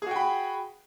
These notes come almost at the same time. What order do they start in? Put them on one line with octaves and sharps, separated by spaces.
G#4 F#4 G5 B5